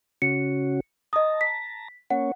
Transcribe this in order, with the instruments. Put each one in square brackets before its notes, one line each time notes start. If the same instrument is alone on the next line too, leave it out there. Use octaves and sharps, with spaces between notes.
[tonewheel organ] C#3 C#4 F#4 [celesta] C#7
[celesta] D#5 D#6 [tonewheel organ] A5 A#5
[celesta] B6
[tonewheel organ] A#3 C#4 C#5 [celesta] F#5